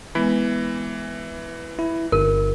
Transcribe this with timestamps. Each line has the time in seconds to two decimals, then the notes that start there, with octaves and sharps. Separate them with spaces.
0.15 E3 G#3 B3
1.79 E4
2.12 G1 A#4